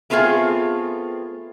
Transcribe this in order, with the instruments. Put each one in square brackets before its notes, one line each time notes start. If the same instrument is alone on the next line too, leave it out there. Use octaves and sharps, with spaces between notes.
[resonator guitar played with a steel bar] A3 B3 C4 F4 G#4